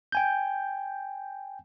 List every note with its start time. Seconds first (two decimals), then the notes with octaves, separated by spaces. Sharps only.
0.12 G5 G#5 G6